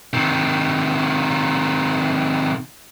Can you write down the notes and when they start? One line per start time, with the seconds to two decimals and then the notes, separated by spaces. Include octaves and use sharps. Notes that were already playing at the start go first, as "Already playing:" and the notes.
0.13 C3 D#3